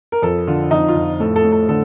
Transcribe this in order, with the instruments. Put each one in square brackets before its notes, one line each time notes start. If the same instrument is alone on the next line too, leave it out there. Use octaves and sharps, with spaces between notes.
[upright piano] A#4
F2 A4
D3 F4
F2 D#4
F4
F2
A2 A4
A4
A2
A4
D3 A4